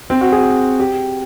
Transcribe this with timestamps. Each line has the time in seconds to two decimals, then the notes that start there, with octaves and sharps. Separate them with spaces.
0.10 C4
0.21 F#4
0.32 G#4
0.80 G4